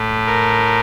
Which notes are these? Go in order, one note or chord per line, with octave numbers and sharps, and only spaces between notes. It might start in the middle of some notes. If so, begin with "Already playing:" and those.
Already playing: A2 A3
A#4